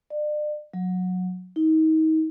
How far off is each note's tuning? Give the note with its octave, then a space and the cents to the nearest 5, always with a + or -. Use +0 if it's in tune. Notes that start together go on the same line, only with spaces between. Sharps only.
D5 +35
F#3 -20
D#4 +30